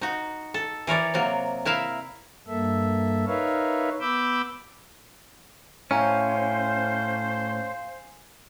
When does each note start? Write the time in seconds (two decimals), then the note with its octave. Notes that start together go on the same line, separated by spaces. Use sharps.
0.01 D#4 F#4
0.54 A4
0.87 E3 A#4 C#5 D5
1.14 C3 F#3 A#3
1.65 E4 A#4 E5 F5
2.47 G2 A#3 A4 E5
3.27 D#4 A#4 B4 C#5 E5 F5
4.01 B3 B5 D6 E6 G6
5.91 A2 C#4 C5 F5 G#5 A#5